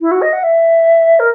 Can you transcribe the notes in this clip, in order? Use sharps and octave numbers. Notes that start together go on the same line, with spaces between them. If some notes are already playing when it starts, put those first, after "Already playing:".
E4
F#4
D#5
F#5
E5
A#4